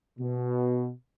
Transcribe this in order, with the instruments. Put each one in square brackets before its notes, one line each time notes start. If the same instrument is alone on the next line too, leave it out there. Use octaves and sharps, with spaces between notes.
[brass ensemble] B2